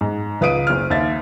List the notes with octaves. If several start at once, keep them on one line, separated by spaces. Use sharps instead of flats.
G#2
C#2 B4 F5 D#6 D7 D#7
F#1 F6
D#2 E5 A6